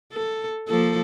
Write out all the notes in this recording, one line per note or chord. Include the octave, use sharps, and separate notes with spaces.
A4
F3 A#3 A4